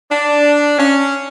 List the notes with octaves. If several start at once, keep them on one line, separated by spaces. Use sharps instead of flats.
D4
C#4